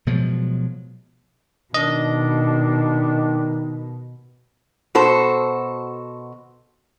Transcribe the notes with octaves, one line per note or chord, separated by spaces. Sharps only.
B2 F3 F#3 G#3
B2 D#3 D4 D#5
B2 F#4 A4 C5